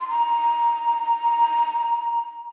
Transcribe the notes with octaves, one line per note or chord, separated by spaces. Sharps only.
C6
A#5